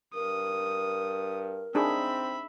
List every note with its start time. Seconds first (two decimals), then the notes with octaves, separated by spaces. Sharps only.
0.14 G2 A#4 D#6
1.75 C4 D4 D#4 G#4 E5 B5